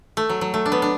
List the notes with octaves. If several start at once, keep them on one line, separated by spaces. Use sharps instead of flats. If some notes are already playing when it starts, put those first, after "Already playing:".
A3
F#3
F#3
A3
D4
B3
D4